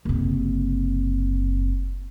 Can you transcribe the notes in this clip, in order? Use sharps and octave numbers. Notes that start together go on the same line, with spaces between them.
F#1 C3